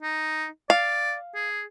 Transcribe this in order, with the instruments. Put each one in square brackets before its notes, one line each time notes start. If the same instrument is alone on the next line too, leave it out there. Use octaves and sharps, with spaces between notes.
[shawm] D#4
[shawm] D5 [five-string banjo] F5
[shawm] G#4